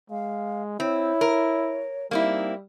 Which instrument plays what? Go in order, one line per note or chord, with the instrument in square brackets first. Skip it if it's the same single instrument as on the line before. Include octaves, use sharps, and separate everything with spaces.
[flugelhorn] G#3 [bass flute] F5
[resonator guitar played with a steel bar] C4 [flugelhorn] E4 [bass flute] C#5
[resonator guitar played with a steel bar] A#4
[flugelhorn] G3 [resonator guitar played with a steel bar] A#3 C4 E4 [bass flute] D#4